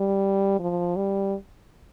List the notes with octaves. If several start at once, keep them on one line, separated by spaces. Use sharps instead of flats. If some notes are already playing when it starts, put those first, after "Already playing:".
Already playing: G3
F3
G3